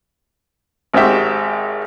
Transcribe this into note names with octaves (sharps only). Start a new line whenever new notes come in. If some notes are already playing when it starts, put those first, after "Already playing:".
G#1 G#3 C4 F#4 G4 E5